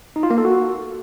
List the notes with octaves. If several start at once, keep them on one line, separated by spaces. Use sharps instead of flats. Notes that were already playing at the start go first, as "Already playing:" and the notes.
D#4
F4
A#3
A4
F#4